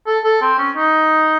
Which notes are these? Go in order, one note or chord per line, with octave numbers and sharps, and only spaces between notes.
A4
A4
C4
C#4
D#4